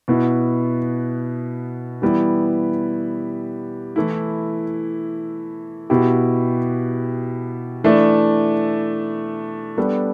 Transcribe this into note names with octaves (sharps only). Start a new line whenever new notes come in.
B2 B3 E4
E3 G3 B3 E4
E3 A3 E4
B2 B3 E4 G4
E3 A3 D4
G3 B3 D4 A4